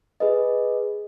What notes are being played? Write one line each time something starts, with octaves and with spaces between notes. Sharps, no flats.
G#4 B4 D#5